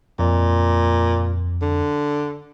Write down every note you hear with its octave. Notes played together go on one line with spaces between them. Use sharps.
F2 A#2
D3